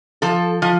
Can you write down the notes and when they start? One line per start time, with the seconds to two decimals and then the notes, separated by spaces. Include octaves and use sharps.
0.22 F3 A4
0.62 F3